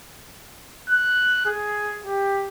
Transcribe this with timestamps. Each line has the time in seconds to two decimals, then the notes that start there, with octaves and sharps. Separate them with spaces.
0.90 F#6
1.46 G#4
2.05 G4